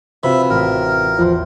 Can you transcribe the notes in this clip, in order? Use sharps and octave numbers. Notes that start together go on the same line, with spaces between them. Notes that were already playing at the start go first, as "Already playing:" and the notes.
C3 F4 F#4 B4 E5
A1 A#4
E2 F3 C6